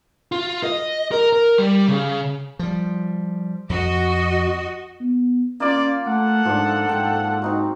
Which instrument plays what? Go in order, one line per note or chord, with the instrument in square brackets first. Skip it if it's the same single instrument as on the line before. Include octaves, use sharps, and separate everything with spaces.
[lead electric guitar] F4
D#5
A#4
A#4
G3
C#3
[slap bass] F3 G3
[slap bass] F2 [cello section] F#4 D#5
[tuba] B3
[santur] A#3 F4 [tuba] C#4 [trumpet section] D5
[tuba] A3 [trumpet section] A4 F#5
[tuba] G#2 [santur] F3 D4
[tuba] G#2 [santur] G5
[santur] C4 D#4 F#4